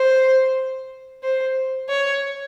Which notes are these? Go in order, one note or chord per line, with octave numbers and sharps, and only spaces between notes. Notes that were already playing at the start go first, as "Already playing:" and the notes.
Already playing: C5
C5
C#5